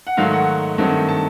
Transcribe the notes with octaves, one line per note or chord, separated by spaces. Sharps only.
F#5
G#2 D#3 F#3 A3 F5
F#5
G2 D#3 F#3 A3 C4
A5